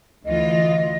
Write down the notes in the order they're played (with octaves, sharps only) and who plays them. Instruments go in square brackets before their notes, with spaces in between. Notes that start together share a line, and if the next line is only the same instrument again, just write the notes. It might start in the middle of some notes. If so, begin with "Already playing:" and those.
[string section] D2 E3 F4 [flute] D#5